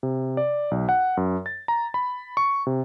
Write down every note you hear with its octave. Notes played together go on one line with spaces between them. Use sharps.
C3
D5
B1
F#5
F#2
A6
A#5
B5
C#6
C3